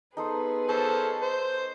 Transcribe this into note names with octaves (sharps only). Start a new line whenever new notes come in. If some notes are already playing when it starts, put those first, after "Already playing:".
B3 D#4 G#4 A4 B4 C5
A4 C5 C#5
C5